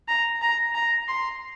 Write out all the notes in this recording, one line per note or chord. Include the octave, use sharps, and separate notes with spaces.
A#5
A#5
A#5
C6